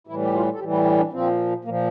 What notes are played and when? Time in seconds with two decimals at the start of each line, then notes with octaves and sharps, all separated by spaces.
0.07 A2 E3 G3 E4
0.22 G4
0.34 F4
0.53 A4
0.59 A2 E3 G3 G4
0.73 E4
0.85 D4
0.98 D4
1.12 A#2 F3 C4
1.64 A#2 F3 A#3